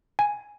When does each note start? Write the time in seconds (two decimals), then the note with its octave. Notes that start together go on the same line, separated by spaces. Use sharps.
0.19 G#5